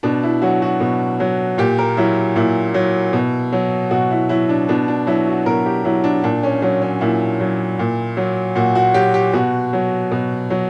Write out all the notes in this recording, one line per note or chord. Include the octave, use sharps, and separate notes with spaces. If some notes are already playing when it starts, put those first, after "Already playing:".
B2 D4
E4
F#3 F#4
F#4
B2
F#3
A#2 G4
A#4
F#3 E4
A#2 E4
F#3
B2
F#3
B2 F#4
E4
F#3 E4
D4
B2 D4
D4
F#3 E4
F#4
B2 A#4
G4
F#3 E4
D4
A#2 D4
C#4
F#3 C#4
C#4
A#2 E4
F#3
A#2
F#3
A#2 F#4
F#4
F#3 G4
G4
B2 F#4
F#3
B2
F#3